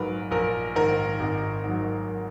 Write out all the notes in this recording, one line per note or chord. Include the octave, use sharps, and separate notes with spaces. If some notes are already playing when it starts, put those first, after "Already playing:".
Already playing: A#1 G#2 F#3 A#4 B4
A#1 A#4
G#2 D#3 A#4
G#1
G#2 F#3